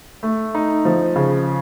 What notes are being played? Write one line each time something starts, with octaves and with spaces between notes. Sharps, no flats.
A3
D#4
F3
C#3